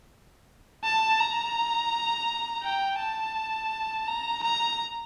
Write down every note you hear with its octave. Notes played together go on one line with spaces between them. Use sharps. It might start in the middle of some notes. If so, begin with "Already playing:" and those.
A5
A#5
G5
A5
A#5
A#5